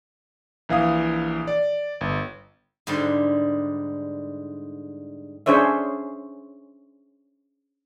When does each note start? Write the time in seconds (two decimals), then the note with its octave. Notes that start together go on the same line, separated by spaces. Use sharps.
0.69 A#1 E3 F5 D#6
1.47 D5
2.01 G1
2.87 G#2 D3 G3 D4
5.46 C#4 D4 G#4 C5 C#5 E5